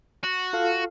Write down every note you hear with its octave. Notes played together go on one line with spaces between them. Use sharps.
F#4
F4 A4 F5